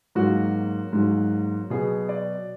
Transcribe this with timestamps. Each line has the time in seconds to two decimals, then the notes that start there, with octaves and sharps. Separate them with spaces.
0.15 G#2 F#3 A#3 F#4
0.93 G#2 F#3 A#3
1.70 B2 F#3 B3 G#4
2.09 D5